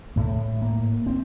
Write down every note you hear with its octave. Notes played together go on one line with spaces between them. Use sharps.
A2 A3
A#3
C4